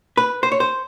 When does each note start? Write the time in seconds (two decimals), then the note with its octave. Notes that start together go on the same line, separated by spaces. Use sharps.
0.17 B4
0.43 C5
0.52 C#5
0.60 C5